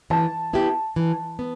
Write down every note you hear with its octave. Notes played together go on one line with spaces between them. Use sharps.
E3 A5
B3 E4 G4
E3
B3